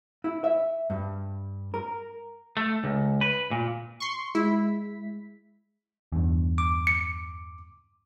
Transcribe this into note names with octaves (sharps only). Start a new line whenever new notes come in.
E4
E5
G2
A#4
A3
C#2
B4
A#2
C6 C#6
G#3 E4 B6
E2 G2
D6
C#7